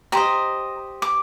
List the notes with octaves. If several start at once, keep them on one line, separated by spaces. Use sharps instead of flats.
G4 C5 D#5 A#5
D6